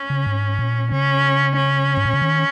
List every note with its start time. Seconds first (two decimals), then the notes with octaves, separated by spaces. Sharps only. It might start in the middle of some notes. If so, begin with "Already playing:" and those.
Already playing: C#4
0.10 C#3
0.27 G#2
0.59 A#2
0.92 C#3 C#4
1.56 C#4
1.97 G#2
2.05 A#2
2.14 C#3
2.22 D#3